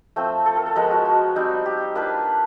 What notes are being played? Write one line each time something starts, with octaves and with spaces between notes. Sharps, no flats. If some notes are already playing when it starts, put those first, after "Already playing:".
F3 A3 C4
A4
A#4
A4
F3 G#3 B3 A#4
F#4
F#4
G3 C4 D#4
G4
A#3 D4 F4 B4